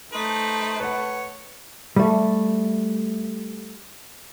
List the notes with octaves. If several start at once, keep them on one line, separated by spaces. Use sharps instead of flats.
A3 D#4 B4 C5
B4 C#5 F#5
G3 A3